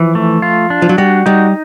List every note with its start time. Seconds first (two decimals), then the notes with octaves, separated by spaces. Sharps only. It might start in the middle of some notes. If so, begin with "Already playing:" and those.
Already playing: E3 F3
0.15 A3
0.42 F4
0.70 D4
0.82 F3
0.89 F#3
0.98 G3 F#4
1.26 G3 D#4